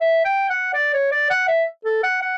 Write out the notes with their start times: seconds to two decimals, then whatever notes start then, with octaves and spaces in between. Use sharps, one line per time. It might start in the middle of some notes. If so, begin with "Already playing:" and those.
0.01 E5
0.25 G5
0.50 F#5
0.74 D5
0.94 C#5
1.12 D5
1.30 F#5
1.48 E5
1.85 A4
2.04 F#5
2.22 F#5